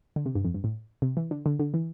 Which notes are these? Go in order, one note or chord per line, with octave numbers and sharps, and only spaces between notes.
D3
C3
G2
F2
G2
A2
C3
E3
D3
D3
D3
E3